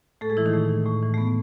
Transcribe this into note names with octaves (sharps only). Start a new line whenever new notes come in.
A2 A3 A4
G#3 G#4
E3 E4
D#3 D#4
A2 A3
E3
A2 A3
E3
A3
A2 B3